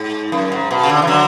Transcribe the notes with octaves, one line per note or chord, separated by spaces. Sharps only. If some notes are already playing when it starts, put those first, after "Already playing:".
Already playing: G#2
F#2
G#2
B2
C#3
D3
E3
D3 F#3